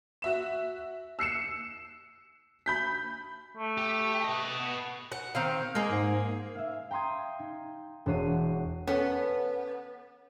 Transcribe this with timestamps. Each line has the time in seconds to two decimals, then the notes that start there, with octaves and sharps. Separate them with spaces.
0.22 F#4 E5 E7
1.19 E6 C7 C#7 E7
2.66 B5 G6 B6
3.57 A3
3.78 G4
4.24 B4 D#5
4.59 B3
5.12 F#5
5.35 D#3 C4 F5
5.75 G#3 A#3 G#4
5.91 G#2
6.55 E5 F5
6.91 G5 A#5 C6 D#6 G#6
7.40 D#4
8.06 E1 D4 F#4 C#5 C7 D#7
8.87 B3 C#4 A4